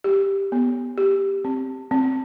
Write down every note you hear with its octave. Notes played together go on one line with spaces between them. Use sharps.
G4
B3
G4
C4
C4